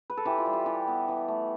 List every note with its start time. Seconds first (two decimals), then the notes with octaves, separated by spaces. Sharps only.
0.10 B4
0.17 A4
0.25 E3 G4
0.38 F4
0.46 G3
0.53 G4
0.66 E3 G4
0.88 B3
1.08 E3
1.28 A3